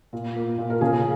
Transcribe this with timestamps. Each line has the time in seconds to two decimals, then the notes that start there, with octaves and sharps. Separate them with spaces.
0.13 A#2
0.36 A#3
0.58 A#2
0.70 A#4
0.81 C#3 G#4